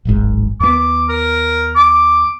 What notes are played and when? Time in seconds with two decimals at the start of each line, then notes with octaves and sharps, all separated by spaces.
0.05 D1 G#1 G#2
0.60 D#2 B3 D6
1.09 A#4
1.75 D6